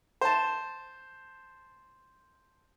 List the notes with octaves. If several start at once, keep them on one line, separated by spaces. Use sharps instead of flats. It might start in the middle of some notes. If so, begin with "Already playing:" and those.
C5 A5